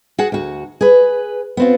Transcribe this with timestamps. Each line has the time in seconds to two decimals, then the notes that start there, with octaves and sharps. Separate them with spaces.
0.18 F#4 G#4 F#5
0.32 D2 F#4
0.81 G#4 B4
1.57 B3 C4 F4